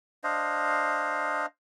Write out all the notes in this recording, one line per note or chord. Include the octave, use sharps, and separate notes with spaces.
D4 C5 D#5 F5